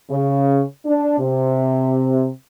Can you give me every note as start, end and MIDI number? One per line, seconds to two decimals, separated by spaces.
0.11 0.61 49
0.86 1.15 62
1.19 2.30 48